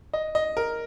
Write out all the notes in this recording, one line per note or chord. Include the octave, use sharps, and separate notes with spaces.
D#5
D#5
A#4